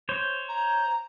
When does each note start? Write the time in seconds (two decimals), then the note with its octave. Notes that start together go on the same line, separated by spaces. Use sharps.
0.09 C5 C#5
0.49 A#5